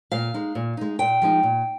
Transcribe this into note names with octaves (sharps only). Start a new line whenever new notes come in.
A#2 F5
G#3 D#4
A#2
G#3 D#4
A#2 G5
F3 G#3 D#4
A#2